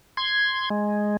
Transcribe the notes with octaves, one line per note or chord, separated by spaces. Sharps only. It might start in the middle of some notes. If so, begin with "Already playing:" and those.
C6 G#6
G#3